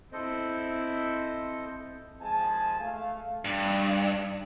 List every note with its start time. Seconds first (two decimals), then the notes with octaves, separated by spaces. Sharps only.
0.13 C4 E4 A4 C5 D#5
2.21 D#2 F3 G#3 G#5 A5
2.81 A3 F5
3.45 G2